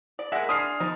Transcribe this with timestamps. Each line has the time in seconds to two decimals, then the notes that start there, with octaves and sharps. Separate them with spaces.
0.19 D5
0.32 G#3 A#3 E5 F#5
0.49 D4 G#4 C6 D#6 F6 C7
0.80 F3 D#4